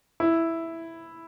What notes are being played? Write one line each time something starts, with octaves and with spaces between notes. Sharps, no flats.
E4